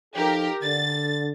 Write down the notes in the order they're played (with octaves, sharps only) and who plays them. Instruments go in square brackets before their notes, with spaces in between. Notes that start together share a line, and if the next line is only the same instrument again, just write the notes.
[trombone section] F3 D#4 A4 [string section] G4 A#4
[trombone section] D3 [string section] A6